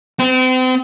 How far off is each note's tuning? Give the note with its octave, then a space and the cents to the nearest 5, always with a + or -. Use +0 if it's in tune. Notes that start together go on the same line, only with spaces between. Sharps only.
C4 -35